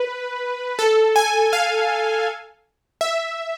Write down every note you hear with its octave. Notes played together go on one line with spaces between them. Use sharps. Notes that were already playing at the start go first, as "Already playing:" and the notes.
Already playing: B4
A4
G#5
F5
E5